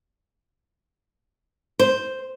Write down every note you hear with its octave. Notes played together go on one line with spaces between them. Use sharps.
C5